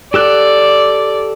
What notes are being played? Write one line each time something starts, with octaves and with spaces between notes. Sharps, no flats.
G4 A4 D5 F#6